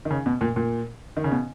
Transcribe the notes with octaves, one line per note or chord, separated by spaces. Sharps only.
D#3
C#3
B2
A#2
A#2
D#3
C#3
B2